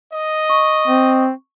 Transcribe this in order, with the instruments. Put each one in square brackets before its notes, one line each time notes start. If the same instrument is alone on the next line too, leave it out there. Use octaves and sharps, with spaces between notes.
[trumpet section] D#5
[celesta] C#6
[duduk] C4